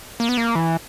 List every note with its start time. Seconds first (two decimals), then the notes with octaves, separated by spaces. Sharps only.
0.20 A#3
0.29 B3
0.38 A#3
0.55 E3